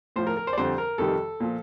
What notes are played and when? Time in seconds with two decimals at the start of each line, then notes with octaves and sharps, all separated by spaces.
0.16 A2 F3 C5
0.27 A#4
0.37 A#4
0.47 C5
0.53 D5
0.57 F2 D3 G3 C5
0.78 A#4
0.98 F2 C3 D#3 G3 A4
1.40 A#2 F3